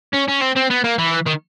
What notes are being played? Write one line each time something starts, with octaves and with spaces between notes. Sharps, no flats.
C#4
C#4
C4
C4
B3
A#3
E3
D#3